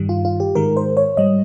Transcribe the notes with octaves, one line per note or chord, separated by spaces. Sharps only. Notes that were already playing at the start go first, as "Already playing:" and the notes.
Already playing: G2 D#3 G3
F4
F4
G4
G#2 D#3 G#3 A#4
C5
C#5
G#2 G3 D#5